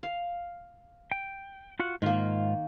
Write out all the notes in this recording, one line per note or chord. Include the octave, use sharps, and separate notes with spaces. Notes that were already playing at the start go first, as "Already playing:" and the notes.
F5
G5
F4 F#4 F#5
G#2 D#3 A#3 F4